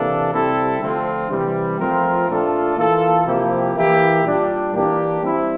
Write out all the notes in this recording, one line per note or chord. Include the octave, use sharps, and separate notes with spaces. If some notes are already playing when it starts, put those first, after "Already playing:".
Already playing: C3 E3 A#3 D4 A4
C3 G3 C4 E4 A4
D3 F3 A3 C4 F4
C3 E3 G3
F3 A3 C4 F4 A#4
A#2 A3 D4 F4 A4
E3 A#3 F4 A4
C3 F3 A#3 E4 G4
E3 A#3 E4 G4
A#2 G3 D4
E3 A#3 D4 G4
G3 C4 E4